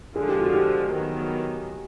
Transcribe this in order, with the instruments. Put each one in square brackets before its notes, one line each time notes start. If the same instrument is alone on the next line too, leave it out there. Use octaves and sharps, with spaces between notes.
[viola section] D3 F3 G#3 [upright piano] G#4
[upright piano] G4
F#4
G4
[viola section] D#3 F#3 B3